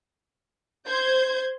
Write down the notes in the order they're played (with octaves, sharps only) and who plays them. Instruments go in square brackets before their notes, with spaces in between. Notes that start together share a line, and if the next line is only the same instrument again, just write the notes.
[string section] C5 G6 G#6